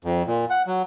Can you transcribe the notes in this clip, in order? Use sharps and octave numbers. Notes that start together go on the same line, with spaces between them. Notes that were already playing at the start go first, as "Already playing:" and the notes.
F2
A#2
F#5
F#3